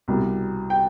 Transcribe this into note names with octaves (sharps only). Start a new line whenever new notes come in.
C2 B2 G3
G5